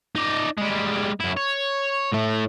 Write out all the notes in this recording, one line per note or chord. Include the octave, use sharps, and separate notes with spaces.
D#4 D5
G3 G#3
F#2 E4
C#5
A2 A3